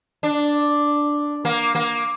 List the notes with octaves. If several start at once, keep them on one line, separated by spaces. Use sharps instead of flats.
D4
A#3
A#3